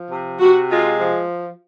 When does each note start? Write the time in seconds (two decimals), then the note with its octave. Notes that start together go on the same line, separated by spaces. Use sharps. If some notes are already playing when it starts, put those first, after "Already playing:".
Already playing: F3
0.11 C3
0.40 C3 F#4
0.70 G#3 F4
1.00 F3